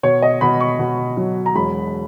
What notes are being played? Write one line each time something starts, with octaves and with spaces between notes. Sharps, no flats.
B2 C#5
D#5
B2 B5
C#6
B2
F#3
A#5
E1 B5